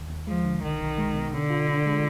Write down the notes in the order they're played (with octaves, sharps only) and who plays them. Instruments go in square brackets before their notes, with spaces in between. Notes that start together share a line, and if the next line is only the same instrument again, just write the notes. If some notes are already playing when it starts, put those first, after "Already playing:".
Already playing: [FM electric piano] D#2
D#2
[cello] F3 [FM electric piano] G#3
[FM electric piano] D3
[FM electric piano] B1 [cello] D#3
[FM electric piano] B1
G#3
B2
[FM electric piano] B2 [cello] D3
[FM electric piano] F4
D4
G#3